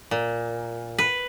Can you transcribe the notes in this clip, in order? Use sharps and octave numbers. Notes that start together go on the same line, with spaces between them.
A#2
B4